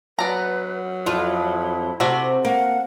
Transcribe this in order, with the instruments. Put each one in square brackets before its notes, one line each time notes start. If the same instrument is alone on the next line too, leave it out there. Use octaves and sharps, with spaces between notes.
[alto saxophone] F#3 [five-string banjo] B3 D5 A#5 [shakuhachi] B4
[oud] F2 F4 [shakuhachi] E4
[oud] C3 [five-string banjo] A3 F#4 E5
[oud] A#3 [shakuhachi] F#5